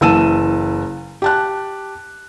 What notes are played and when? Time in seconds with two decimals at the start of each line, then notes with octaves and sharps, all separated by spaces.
0.01 F#1 E3 A5 E6 D#7 E7
1.22 G4 A5 F#6